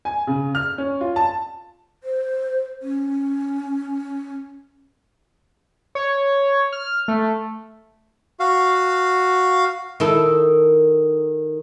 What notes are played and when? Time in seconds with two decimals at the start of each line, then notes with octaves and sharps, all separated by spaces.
0.05 G#5
0.27 C#3
0.55 F6
0.78 C#4
1.01 F4
1.16 A5
2.04 C5
2.82 C#4
5.95 C#5
6.73 F6
7.08 A3
8.40 F#4 F5
10.00 D#3 E4 A4